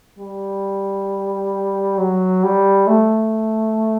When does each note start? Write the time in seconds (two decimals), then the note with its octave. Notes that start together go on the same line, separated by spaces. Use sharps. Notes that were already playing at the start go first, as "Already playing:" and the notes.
0.18 G3
1.98 F#3
2.43 G3
2.87 A3